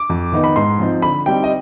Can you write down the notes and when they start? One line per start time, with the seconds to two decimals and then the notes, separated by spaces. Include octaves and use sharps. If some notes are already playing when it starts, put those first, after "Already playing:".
Already playing: D6
0.09 F2
0.32 D#3 B3 D#4
0.44 B5
0.56 G#2 C6
0.79 F3 C4 D#4
1.02 D3 B5
1.26 G3 C4 D#4 G5
1.44 D#5